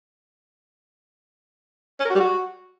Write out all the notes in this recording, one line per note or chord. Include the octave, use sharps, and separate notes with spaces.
C#4
A#4
F#4
G3
F#4